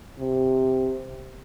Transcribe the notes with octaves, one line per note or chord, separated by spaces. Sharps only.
C3